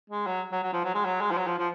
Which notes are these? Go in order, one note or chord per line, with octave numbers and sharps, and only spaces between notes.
G#3
F#3
F#3
F#3
F3
F#3
G#3
F#3
G#3
F3
F#3
F3
F3